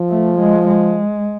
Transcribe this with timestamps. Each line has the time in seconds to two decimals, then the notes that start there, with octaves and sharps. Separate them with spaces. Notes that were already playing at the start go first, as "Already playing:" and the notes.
Already playing: F3
0.10 A3
0.39 G#3
0.68 G#3